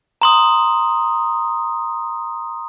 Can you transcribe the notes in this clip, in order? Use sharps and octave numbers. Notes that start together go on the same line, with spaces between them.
A#5 C6 D#6